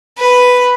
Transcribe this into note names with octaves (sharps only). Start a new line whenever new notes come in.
B4